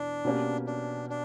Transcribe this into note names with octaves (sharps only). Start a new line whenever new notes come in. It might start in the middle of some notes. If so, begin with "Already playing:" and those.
Already playing: E2 B2 D4
B2 A#3 C#4 G4
D4
D4